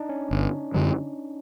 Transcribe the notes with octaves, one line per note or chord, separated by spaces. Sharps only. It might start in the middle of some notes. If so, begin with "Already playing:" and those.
Already playing: D4 D#4
C#4
G1
F#2 D3 F#3